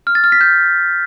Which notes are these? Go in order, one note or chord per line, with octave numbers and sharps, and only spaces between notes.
F6
A6
F6
B6
G6